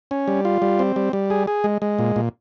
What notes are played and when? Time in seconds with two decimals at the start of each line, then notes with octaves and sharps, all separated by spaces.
0.11 C#4
0.28 G3
0.45 F4
0.62 G3
0.79 C4
0.96 G3
1.13 G3
1.30 G#4
1.47 G#4
1.64 G#3
1.82 G#3
1.99 A#2
2.16 A#2